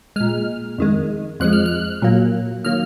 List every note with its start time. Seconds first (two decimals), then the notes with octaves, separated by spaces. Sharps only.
0.16 A#2 G#3 F6
0.78 F2 D#3 G#3
1.40 F2 F3 G#3 F#6
1.53 F6
1.66 F#6
2.02 A#2 F#3 A#3
2.65 D#3 F#3 A#3 F6